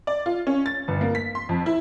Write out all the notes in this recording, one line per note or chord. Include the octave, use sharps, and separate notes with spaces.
D5
F4
C#4
A6
G1
A#3
B6
C6
F2
E4